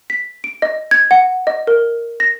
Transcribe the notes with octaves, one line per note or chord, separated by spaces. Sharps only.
B6
D7
D#5
G#6
F#5
D#5
A#4
A#6